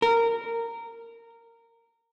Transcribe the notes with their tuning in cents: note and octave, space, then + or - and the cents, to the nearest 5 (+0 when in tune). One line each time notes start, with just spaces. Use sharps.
A#4 -15